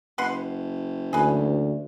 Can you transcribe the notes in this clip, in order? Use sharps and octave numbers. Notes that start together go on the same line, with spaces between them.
F#1 B4 F#5 C6
D2 G#4 B4